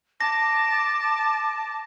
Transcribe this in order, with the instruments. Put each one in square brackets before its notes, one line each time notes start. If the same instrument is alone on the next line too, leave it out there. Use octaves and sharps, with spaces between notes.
[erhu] A5 [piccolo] D6 [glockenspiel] A#6